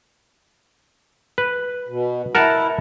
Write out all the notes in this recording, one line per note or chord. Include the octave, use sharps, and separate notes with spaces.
B4
B2
E4 A#4 F#5 A5